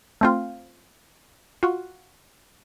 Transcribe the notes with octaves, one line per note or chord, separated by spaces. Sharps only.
A3 C4 F4
F4 F#4